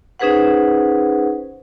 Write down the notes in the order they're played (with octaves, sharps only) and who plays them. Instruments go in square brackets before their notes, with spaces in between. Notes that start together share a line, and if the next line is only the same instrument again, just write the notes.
[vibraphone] C#4 D#4 G#4 B4 C5 F#5